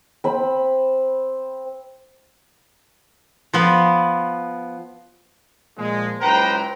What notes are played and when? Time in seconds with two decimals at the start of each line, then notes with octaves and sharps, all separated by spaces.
0.24 C4 B5
3.53 F3 B3
5.77 A#2 F3 G#3
6.21 F#1 C#2 B4 C5 G5 A#5